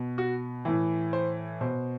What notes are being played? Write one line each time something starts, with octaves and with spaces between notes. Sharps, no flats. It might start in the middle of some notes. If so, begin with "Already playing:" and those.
Already playing: B2
F#4
A2 E3
C5
B2 C5